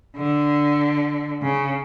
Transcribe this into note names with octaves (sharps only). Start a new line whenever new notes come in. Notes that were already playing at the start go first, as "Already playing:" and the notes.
D3
C#3